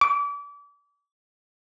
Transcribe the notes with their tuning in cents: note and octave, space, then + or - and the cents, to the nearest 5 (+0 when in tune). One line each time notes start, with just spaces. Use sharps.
D6 -35